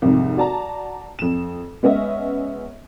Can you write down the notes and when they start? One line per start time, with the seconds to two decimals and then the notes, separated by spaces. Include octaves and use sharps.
0.02 C2 F2 G#2
0.36 F#4 D5 A5 A#5
1.19 F2 E7
1.83 G#3 B3 C#4 D#5 E5